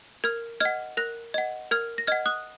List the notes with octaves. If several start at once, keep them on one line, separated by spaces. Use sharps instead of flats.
A#4 F6 G#6
D#5 F#5 F6 G#6
A#4 F#6 A#6
D#5 F#5
A#4 F6 G#6
A#6
D#5 F#5 F6 G#6
D#6 F#6